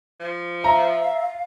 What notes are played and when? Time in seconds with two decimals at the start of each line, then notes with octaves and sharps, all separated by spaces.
0.20 F3
0.64 E5 F5 A#5